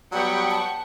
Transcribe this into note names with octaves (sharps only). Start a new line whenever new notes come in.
F#3 G3 B3 G4 F#5 G5 C#6
A5